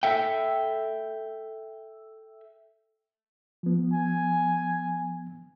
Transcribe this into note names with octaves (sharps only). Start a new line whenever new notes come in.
A4 E5 G5
F3 B3
G#5